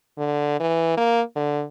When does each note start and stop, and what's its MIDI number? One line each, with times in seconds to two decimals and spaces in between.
0.18 0.58 50
0.60 0.94 52
0.97 1.21 58
1.36 1.63 50